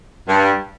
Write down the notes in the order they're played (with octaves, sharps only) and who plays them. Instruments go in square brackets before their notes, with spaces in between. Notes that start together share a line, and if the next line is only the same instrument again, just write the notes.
[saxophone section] G2